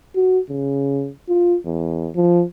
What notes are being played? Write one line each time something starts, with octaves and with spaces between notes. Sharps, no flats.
F#4
C#3
F4
E2
F3